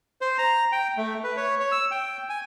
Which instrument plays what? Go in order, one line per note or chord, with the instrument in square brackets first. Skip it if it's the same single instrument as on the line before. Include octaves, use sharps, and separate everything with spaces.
[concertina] C5
A#5
G5
A3
B4
C#5
C#5
E6
G5
G#5